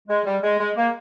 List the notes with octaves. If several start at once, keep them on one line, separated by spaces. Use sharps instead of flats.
G#3
G3
G#3
G#3
A#3